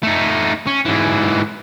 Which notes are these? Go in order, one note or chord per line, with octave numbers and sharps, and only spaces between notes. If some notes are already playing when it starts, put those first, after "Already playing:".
A3 D#4
C#4
G#2 E3